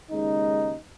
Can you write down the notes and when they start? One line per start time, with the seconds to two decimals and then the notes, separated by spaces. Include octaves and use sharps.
0.10 D#2 C#3 G#3 D#4